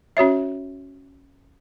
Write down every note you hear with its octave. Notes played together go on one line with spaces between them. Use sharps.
C#4 F#4 C#5 E5